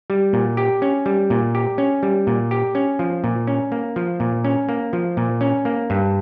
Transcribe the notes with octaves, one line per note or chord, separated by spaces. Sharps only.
G3
A#2
G4
C#4
G3
A#2
G4
C#4
G3
A#2
G4
C#4
F3
A#2
C#4
A#3
F3
A#2
C#4
A#3
F3
A#2
C#4
A#3
G2